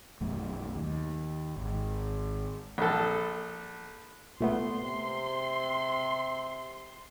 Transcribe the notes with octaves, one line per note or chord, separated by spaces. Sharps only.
B1 F#2 F#3 A3
D#2
G#1
A#1 A4
A#2 A3 B3 C6
C3